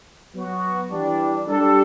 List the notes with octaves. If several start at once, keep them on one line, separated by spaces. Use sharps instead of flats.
F#3 B3 F#4
E3 G3 D4
G3 D4 A4